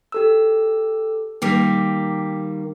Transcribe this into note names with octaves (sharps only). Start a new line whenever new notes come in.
G4 A4 E6
D#3 G3 A#3 G5 D6 B6